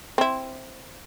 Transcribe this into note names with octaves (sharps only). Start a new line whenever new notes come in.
C4 E4